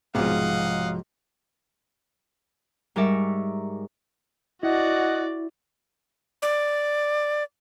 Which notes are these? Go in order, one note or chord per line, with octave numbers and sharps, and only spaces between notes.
B1 G#2 C3 F3 D#5 F5 F#5
G#2 G3 A#4 D5 E5 C#6
E4 F#4 D5 D#5 F#5
D5